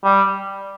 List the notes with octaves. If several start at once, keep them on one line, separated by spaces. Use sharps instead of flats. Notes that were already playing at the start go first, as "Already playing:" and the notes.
G3